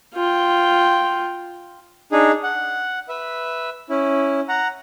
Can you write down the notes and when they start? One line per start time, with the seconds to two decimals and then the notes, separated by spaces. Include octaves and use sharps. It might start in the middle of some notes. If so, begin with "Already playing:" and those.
0.15 F4 G5
2.12 D4 D#4 G#4
2.43 F#5
3.09 B4 E5
3.89 C#4 E4
4.48 F#5 A#5